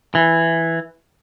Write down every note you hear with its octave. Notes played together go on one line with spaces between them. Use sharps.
E3